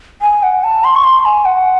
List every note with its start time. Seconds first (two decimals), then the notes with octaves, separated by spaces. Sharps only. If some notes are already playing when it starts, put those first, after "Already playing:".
0.21 G#5
0.43 F#5
0.64 A5
0.84 C6
0.96 C#6
1.04 C6
1.25 G#5
1.45 F#5